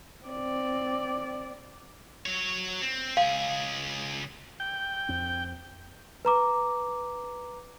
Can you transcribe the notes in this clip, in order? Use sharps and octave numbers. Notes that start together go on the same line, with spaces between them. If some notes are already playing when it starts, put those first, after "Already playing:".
C4 D5
F#3 C#5
C4
C#2 G#4 F5
G5
F2 C4
B4 A#5 D6